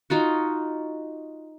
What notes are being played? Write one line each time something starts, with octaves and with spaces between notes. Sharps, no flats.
D#4 F4 F#4